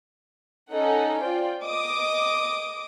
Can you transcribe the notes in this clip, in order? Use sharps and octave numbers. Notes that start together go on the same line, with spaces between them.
C#4 D#4 A4 D#5 F#5
F4 C5 D5 G5
D#5 D6 D#6